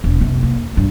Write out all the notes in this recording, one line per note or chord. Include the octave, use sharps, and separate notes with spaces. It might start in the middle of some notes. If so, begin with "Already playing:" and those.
E1
F2 C3
A#3
G2